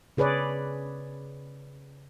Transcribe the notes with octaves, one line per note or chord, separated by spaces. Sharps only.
C#3 G#4 B4 C#5 D5